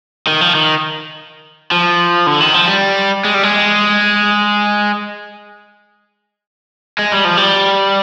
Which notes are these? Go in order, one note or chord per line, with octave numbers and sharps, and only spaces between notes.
D#3
F3
D#3
F3
D3
D#3
F3
G3
G#3
G3
G#3
G#3
G3
F3
G3